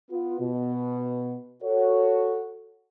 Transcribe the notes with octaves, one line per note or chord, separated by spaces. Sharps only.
B3 F4
B2
F#4 A4 C#5